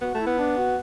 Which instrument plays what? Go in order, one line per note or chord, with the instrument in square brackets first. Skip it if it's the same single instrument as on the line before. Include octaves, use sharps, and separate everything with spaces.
[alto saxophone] B3 [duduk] F#4
[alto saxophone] A3
[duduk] E4
[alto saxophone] B3
[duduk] D4
F#4